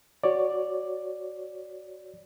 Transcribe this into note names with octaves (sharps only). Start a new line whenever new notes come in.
F#4 C#5 D5